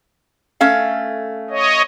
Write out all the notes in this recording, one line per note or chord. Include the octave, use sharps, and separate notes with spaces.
A3 C#4 F5
C#5 D#5